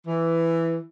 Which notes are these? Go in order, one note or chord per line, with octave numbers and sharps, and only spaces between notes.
E3